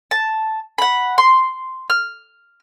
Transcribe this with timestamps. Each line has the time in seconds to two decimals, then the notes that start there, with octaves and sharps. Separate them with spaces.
0.11 A5
0.78 F#5 B5
1.18 C6
1.90 F6